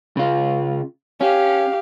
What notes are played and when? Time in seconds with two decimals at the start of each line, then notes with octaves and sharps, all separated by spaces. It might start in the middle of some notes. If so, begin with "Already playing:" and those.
0.17 C#3 F4
1.21 C#4 G4 F5